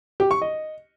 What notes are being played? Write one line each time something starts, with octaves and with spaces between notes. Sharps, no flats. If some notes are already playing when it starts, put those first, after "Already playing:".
G4
C#6
D#5